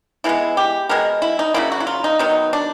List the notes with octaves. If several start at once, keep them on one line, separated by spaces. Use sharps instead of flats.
E3 G#3 B3 E4
G4
B2 G#3 B3 A#4
E4
D#4
C#3 F#3 A#3 E4
F#4
E4
F4
D#4
D#3 F#3 B3 D#4
D4